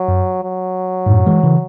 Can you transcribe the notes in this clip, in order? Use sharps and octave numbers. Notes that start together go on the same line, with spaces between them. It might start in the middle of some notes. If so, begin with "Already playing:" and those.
Already playing: F#3
F#2
F#3
G#2
F#2 A2
E3 G#3
C#3 E3